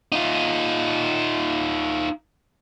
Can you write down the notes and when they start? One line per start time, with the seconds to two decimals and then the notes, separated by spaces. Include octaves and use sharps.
0.12 D#4 F4